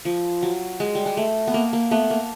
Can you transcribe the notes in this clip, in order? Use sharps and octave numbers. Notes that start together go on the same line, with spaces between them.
F3
F#3
G#3
G3
G#3
A3
B3
A#3
A#3
A3 B3
A#3